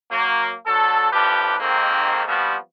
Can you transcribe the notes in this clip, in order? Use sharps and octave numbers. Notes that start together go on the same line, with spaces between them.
F#3 A#3
D3 F#3 A4
A1 F3 D4 G4 B4
F2 G#2 D#3 A#3 C4
F3 G3 B3 C4 F#4